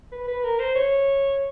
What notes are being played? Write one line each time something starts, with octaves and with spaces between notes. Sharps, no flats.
B4
B4
A#4
C5
C#5